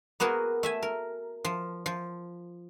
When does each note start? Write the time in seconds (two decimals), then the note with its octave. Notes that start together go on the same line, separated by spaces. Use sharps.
0.20 A#3 B3 F#4 G#4 A#4
0.63 A3 E5 G#5
0.83 A#4
1.45 F3
1.86 F3